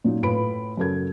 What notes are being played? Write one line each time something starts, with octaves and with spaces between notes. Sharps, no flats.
A#2 F#3 D#4
A2 F4 B4 B5 D7
F#2 C#3 F#3 A4 A#4 G#6